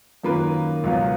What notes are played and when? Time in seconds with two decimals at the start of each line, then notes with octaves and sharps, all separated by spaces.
0.23 F#2 D#3 A#3 F4 B4
0.84 C#2 B2 F#3 B3